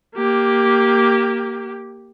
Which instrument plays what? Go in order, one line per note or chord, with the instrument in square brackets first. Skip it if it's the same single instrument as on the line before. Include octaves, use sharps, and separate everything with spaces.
[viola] A#3 G4